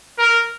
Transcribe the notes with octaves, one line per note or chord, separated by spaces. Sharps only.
A#4